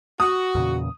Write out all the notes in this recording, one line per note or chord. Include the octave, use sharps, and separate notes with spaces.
F#4 D#6
E2 A#2 C#3